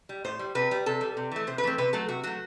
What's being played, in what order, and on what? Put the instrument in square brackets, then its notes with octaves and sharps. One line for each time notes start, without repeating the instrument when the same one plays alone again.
[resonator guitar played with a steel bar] G3
A2 C5
G3
C3 B4
G3
C3 A4
G3
C3
E3 A3
C3 C5
B4
E3 A3 C4
C3 B4
F#3 A3 A4
C3 F#4
F#3 A3 F#4